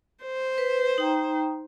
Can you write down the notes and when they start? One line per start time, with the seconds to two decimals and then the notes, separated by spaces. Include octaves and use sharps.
0.24 C5
0.58 B4
0.98 D#4 G5 A#5